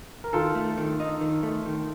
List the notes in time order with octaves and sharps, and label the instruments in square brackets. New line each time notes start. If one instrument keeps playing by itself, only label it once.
[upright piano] A#4
[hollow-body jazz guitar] D#3 [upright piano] F4 A4
[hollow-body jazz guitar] A3
D#3
D#4
D#3
A3
D#3